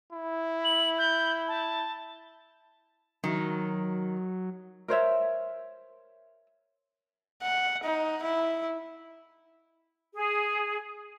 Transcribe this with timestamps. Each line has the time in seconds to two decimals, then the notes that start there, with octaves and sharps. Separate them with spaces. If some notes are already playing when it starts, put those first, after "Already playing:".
0.13 E4
0.65 F#7
0.98 G6
1.48 A5
3.24 D#3 F#3
4.88 A#4 C5 C#5 E5
7.42 F#5
7.83 D#4
8.23 E4
10.14 G#4